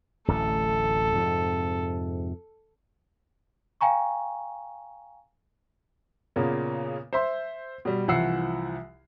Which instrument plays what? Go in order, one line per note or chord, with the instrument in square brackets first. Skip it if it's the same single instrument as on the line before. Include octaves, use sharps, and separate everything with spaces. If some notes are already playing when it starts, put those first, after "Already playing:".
[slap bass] D1 A1 A3 [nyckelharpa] A4
[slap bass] F2 G#2 C3
[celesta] F5 G5 G#5 A#5 C#6
[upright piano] A#2 C#3 A#3 B3
C5 E5 C6
B2 G3
C2 E3 F3 F#5 E6 C7